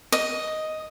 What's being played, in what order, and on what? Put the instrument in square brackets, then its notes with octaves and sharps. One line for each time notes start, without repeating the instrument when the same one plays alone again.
[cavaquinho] D#5